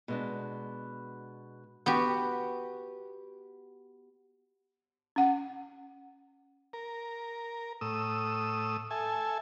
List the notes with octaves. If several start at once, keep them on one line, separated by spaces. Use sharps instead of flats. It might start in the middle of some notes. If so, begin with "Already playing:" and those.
B2 G#3 D4
B3 F#4 G4
C#4 F#5
A#4
A2 D#6 E6
A4 E5 G#5